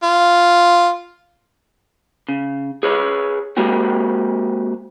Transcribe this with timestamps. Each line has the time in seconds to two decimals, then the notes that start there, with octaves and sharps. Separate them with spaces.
0.03 F4
2.29 C#3
2.83 G#4 B4 C#5
3.57 G#3 A#3 C4 F#4 G4